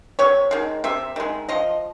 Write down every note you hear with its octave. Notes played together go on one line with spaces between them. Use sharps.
C3 C#5
D#3 G#3
C3 E5
D#3 G#3
F3 D#5